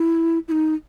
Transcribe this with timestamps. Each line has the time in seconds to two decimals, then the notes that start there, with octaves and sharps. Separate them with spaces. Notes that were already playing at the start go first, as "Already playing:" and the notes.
Already playing: E4
0.48 E4
0.52 D#4